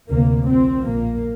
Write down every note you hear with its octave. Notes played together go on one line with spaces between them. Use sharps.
D2 C3 A#3
A#1 A#2 C4
A#1 A#2 A#3